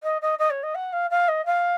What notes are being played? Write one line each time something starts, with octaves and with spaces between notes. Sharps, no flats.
D#5
D#5
D#5
C#5
D#5
F#5
F5
F5
D#5
F5